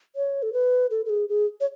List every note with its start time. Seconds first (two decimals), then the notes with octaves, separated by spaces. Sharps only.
0.16 C#5
0.43 A4
0.53 B4
0.91 A4
1.05 A4
1.10 G#4
1.29 G#4
1.61 C#5